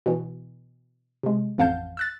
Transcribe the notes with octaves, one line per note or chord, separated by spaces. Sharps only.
B2 E3
C3 G#3
A1 F2 F5 F#5 A5 G6
E6 F#6 A6